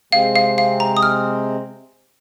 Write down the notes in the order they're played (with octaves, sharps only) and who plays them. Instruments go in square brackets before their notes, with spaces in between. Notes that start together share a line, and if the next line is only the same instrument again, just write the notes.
[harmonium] C3 G#3 C4 [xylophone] F5
[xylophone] F5
F5
A#5
D#6
F6